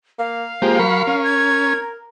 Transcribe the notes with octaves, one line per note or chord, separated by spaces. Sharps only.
A#3 F5
F3 G#3 A#3 G4
F#3 A#4 B5 C#6
C#4
G#6